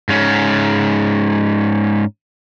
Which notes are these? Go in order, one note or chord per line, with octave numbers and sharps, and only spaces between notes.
G#2 C#4